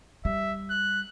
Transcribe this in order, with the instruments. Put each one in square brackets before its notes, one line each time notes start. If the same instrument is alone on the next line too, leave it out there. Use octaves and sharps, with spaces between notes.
[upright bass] G3 [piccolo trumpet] E5
[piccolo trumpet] F#6